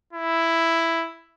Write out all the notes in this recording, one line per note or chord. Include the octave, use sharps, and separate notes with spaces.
E4